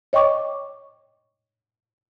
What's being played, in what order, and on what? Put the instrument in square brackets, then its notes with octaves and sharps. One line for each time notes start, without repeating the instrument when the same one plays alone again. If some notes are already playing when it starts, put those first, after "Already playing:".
[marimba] C#5 D#5 G5 C#6 D6